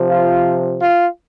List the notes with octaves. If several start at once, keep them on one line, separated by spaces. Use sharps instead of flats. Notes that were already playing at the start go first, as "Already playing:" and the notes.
Already playing: C3 F3
F4
F4